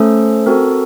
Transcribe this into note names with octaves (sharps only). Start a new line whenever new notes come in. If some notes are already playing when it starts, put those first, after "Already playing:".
Already playing: A3 C#4 A4 C5
C4 F#4 A4 A#4